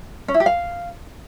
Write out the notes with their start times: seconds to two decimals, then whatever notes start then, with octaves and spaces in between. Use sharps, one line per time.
0.28 C#4
0.34 E4
0.40 G4
0.46 F5